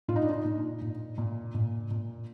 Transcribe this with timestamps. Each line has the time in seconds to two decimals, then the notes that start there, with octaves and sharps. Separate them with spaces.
0.08 A#2 F4
0.16 D#4
0.22 D4
0.30 D#4
0.45 A#2
0.82 A#2
1.18 A#2
1.54 A#2
1.91 A#2